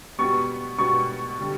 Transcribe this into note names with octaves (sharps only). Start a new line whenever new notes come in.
B2 G3 B3 C#6
B2 G3 B3 C#6
D3 G3